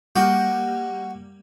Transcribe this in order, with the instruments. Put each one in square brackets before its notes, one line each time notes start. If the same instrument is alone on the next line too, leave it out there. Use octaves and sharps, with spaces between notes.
[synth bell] G3 A#3 G4 [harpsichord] F#4